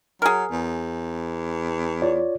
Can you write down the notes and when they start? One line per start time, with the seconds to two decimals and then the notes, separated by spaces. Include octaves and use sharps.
0.22 F#3 G#4 A#4
0.51 E2
2.02 F4 C#5 D5